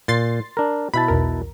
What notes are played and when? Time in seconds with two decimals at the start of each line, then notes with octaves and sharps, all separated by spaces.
0.08 A#2 C6 A6 C7
0.57 D4 A#4
0.94 B2 E4 A5 B5
1.08 B1 E2 A#4